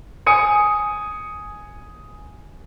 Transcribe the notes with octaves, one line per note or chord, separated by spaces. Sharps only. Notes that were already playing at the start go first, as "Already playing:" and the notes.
G#5 D#6 C#7 D#7